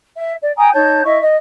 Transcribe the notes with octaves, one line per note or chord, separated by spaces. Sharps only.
E5
D5
G5 G#5 A#5 D#6
D#4 C#5 A5 G6
E4 D#5 E5 C#6
D#5